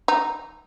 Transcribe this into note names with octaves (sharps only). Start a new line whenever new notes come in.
D#4